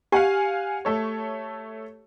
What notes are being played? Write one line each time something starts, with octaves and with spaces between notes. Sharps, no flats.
G4 F5 F#5 G#5
A3 A4 C#5